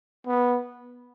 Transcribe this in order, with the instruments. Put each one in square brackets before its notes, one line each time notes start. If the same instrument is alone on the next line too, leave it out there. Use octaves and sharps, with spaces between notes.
[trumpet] B3